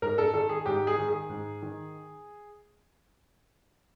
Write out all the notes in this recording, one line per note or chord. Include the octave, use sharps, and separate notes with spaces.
G#2 A#4
A4
D#3 A4
G#4
G#2 G4
G#4
D#3
G#4
G#2
D#3